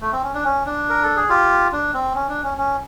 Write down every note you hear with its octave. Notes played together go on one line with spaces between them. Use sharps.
A3
C4
C#4
D4
C#4
D4
A#4
A4
G#4
F4 G4
D4
C4
C#4
D4
C#4
C#4